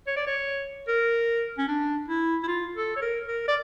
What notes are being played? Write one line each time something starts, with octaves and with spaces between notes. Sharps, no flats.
C#5
D5
C#5
A#4
C#4
D4
E4
E4
F4
A4
C#5
A#4
A#4
D5